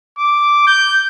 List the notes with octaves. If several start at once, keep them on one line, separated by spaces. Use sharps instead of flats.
D6
G6